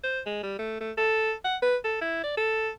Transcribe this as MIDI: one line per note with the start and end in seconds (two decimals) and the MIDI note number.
0.04 0.20 72
0.26 0.41 56
0.43 0.55 55
0.59 0.76 57
0.81 0.92 57
0.98 1.33 69
1.45 1.56 78
1.62 1.77 71
1.85 1.99 69
2.01 2.23 64
2.24 2.35 74
2.37 2.70 69